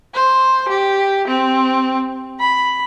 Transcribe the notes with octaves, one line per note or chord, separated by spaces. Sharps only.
C5
G4
C4
B5